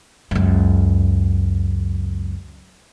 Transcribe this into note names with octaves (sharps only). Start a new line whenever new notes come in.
C#2 F#2